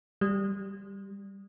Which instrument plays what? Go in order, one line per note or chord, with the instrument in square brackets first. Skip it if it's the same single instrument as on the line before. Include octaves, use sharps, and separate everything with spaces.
[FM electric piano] G3